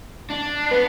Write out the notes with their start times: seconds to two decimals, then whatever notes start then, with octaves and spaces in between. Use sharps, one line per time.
0.30 D4
0.71 B3 B4